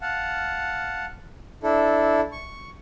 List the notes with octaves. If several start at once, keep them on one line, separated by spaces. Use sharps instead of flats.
F5 F#5 A5
D4 E4 A4
C#6